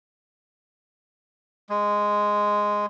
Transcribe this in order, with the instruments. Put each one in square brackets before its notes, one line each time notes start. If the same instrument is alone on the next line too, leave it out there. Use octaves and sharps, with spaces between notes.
[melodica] G#3